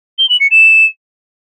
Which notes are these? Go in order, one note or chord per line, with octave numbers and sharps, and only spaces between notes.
G7
F#7
C#7
E7